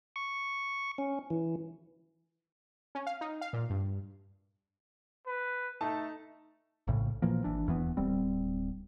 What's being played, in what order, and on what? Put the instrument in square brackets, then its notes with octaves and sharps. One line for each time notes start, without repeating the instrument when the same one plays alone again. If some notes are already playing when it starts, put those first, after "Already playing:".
[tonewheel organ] C#6
C#4
E3
[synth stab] C#4
F5
D#4
F5
A#2
G2
[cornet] B4
[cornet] A3 [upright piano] D#4 A5
[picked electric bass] A#1 A2 C#3
A#2 E3 F3 A#3
G#1 E3 D4
D#1 E2 E3 B3
D1 G3 C4